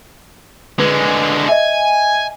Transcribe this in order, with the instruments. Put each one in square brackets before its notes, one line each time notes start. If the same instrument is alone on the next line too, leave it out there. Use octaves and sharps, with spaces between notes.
[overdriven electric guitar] D3 G#3 [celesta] B4
[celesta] D#5 E5 [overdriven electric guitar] G#5